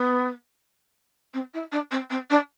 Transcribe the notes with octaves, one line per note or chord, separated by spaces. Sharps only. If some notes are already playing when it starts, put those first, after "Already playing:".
Already playing: B3
C4
E4
D4
C4
C4
D4